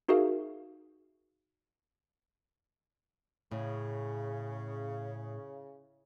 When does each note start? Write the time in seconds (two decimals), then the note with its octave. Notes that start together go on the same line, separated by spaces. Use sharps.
0.08 D#4 F#4 G#4 A#4 E5 F5
3.52 A2 C#3